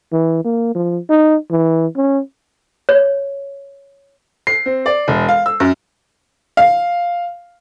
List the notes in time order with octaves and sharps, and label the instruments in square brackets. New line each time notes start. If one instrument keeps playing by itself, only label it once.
[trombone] E3
A#3
F3
D#4
E3
C#4
[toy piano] C#5
[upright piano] C7
C4
D5
E1
F5
E6
F#2
[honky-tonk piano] F5